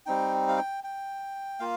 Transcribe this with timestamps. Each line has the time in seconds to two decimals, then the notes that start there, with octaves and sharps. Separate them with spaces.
0.06 G3 C4 D#4 G5
0.48 F5
0.57 G5
0.84 G5
1.60 A#3 F4 F5